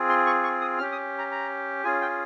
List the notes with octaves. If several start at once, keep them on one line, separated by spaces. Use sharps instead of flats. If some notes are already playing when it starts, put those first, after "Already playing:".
Already playing: C4 F4 G#4
C6
C#6
C#6
D#6
C#4 G4 F6
D#6
A#5
A#5
C#4 F4 G#4 G#5
G5